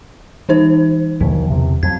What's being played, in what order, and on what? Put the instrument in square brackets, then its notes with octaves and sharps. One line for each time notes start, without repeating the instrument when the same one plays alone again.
[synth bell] E3 D#4 C5
[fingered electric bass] D#2 B2 E3 [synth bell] D3
[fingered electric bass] E2 C3
[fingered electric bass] F2 F#3 [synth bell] G#6